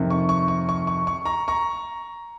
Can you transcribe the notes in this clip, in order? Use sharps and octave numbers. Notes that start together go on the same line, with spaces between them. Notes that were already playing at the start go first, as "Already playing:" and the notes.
Already playing: F2 C3 D#3
C#6
C#6
C#6
C#6
C#6
C#6
A#5 C#6
A#5 C#6